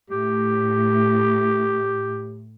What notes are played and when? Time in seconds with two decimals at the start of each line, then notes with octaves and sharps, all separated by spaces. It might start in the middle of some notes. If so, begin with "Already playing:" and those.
0.10 A2 G4